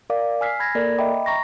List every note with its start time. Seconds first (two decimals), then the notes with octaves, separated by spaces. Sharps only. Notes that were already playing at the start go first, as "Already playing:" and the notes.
0.10 A#4 D5 F5 D6
0.41 G#5 E6 F6 B6 C7
0.60 B5 G#6 A#6
0.75 A#3 A4 A#4 D5
0.98 D#5 E5 G5 A#5 B5 D6
1.26 A#5 C#6 A#6